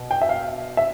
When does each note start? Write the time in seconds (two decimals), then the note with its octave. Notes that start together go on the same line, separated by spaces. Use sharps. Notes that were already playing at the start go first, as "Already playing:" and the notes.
Already playing: B2
0.11 G5
0.22 E5
0.29 F5
0.77 E5